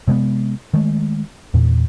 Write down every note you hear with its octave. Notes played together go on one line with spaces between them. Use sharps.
C3 G#3 A3 B3
D#3 G#3 A3
E2 A#2